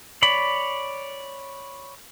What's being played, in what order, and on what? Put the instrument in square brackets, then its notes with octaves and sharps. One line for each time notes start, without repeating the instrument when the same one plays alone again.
[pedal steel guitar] C#5 D5 B5